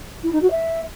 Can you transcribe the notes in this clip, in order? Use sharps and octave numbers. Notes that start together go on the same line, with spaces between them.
E4
D#4
F#4
E5